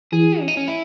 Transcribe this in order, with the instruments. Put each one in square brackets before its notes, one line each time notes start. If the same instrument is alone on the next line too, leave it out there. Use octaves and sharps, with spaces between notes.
[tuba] E3 [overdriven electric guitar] G#4
[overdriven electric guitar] C#4
D#4
C#4
E4